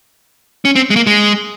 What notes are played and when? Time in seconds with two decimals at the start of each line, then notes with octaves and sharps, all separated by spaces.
0.65 C#4
0.76 C4
0.90 G#3
0.96 A#3
1.07 G#3